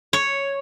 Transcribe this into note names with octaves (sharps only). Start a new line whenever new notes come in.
C#5